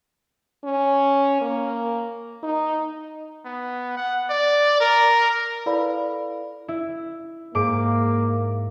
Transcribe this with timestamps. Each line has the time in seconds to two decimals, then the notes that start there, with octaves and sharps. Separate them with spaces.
0.64 C#4
1.41 A#3
2.43 D#4
3.46 B3
3.97 F#5
4.30 D5
4.81 A#4
5.66 E4 A4 B4 D5 F5 B5
6.68 E4
7.55 G#2 A#3 D6